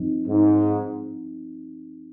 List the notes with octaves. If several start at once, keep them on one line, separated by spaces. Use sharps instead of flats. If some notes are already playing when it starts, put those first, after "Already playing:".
Already playing: G2 F3 C4 D#4
G#2